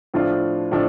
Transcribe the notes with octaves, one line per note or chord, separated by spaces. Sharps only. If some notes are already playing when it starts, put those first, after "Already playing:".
A2 F3 D4 F4
A2 F3 D4